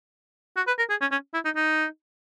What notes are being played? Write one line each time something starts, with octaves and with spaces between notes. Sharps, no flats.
F#4
B4
A#4
G#4
C#4
C#4
E4
D#4
D#4